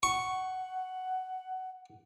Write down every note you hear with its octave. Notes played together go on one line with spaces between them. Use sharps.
F#5 C#6